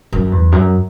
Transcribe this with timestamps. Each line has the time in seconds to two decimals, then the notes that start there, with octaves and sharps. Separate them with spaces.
0.13 F#2
0.32 E2
0.52 F#2